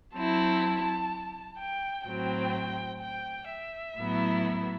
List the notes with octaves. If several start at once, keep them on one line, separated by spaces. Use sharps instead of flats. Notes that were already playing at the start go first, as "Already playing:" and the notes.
F#3 C4 E4 A5
G5
A2 F#3 C4 G5
G5
E5
A2 F#3 B3 E4